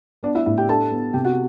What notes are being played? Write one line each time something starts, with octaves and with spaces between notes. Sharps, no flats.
B3 D4 D5
E4 E5
A2 E4 E5
G4 G5
D4 A4 A5
B3
C3 G4 G5
F#4 F#5